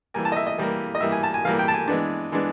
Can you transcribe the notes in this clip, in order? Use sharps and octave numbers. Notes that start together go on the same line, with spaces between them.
E3 G3 A#3 G#5
A5
D#5
E5
D#5
E3 G3 A#3
D#5
E3 G3 A#3 E5
G#5
A5
G#5
E3 G3 A#3 F5
G5
A5
G#5
E3 G#3 B3 D4
E3 G#3 B3 D4